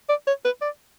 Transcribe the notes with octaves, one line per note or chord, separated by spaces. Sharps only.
D5
C#5
B4
D5